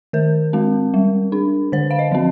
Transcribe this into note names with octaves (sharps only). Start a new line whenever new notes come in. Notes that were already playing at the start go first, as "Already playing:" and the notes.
D#3 A#4
G#3 C4
G3
D4
D3 C5
F5
D#5
F3 C4